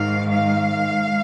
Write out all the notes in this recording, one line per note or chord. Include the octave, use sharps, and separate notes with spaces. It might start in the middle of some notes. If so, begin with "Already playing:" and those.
Already playing: G#2 D#3 G#3 F5
F5